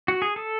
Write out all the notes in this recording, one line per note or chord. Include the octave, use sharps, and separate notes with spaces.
F#4
G#4
A4